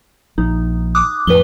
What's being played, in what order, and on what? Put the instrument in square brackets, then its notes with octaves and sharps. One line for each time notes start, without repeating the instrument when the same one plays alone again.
[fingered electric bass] A#1 [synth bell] D#4
[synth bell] D6 D#6 F#6
[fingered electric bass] F2 A2 [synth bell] B4 G7